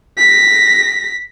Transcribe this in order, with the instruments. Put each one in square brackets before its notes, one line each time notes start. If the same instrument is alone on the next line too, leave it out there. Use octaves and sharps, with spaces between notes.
[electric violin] A#6 B6